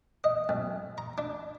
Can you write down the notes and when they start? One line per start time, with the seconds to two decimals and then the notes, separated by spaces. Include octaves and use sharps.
0.24 D#5
0.49 B1
0.98 A#5
1.18 D4